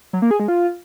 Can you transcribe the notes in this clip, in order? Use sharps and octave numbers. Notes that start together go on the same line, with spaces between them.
F#3
A#3
G#4
G#3
F4